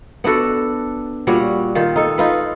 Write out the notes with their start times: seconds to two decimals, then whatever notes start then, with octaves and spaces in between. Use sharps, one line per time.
0.24 B3 D4 F#4 A4
1.27 A#2 G3 F#4 C#5
1.75 D#3 F4
1.96 D#4 A4
2.18 D#4 F4 B4